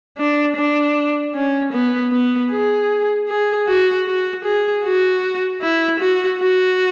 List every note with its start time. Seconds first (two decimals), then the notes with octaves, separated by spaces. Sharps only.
0.17 D4
0.56 D4
1.35 C#4
1.73 B3
2.12 B3
2.51 G#4
3.28 G#4
3.67 F#4
4.07 F#4
4.44 G#4
4.83 F#4
5.62 E4
6.00 F#4
6.39 F#4